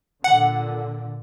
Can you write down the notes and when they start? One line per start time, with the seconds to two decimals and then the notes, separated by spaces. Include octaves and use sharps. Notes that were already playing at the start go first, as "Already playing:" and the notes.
0.24 A#2 D3 F#5